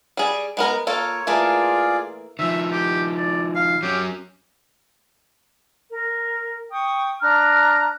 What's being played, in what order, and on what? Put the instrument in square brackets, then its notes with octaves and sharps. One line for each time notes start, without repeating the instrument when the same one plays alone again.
[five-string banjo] G3 G#4
G#3 B3 A#4
[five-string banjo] A#3 F4 A4 [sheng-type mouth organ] C#5
[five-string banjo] E3 A3 A#3 [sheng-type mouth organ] F4 G#4 D5
[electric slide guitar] D#3 F3 [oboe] E5
[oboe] G4
D5
F5
[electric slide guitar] F#3 C#4 [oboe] G4
[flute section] A#4
G5 C#6 D#6
D4 A#5 F6 F#6